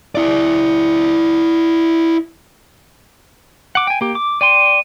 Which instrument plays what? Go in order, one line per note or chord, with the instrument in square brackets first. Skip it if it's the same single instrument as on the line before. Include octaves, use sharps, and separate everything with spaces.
[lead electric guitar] E4 D5
[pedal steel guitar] F#5 D6
G5 G#5
A#3 G4
D6
[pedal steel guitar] D5 G5 C6 [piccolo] D#7